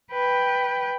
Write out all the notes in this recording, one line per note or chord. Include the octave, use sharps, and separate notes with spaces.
B4 G5